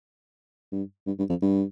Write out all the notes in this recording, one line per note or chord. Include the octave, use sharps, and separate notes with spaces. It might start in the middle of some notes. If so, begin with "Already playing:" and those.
G2
G2
G2
F2
G2